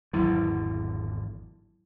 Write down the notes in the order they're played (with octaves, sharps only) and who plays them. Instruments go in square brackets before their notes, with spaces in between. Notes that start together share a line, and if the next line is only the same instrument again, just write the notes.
[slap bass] G#1 E2 D3 [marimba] F#3 E4